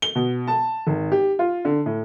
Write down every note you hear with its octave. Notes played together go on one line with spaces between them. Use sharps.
G7
B2
A5
G#1
G4
F4
D3
A2